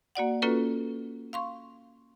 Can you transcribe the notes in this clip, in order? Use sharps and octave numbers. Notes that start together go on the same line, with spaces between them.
A#3 F#4 D5 F#5
A#3 C#4 F4 F#4 A4 B4
F5 C6 C#6